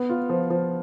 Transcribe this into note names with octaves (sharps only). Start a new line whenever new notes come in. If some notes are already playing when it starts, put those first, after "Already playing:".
Already playing: B3
F4
F3
F3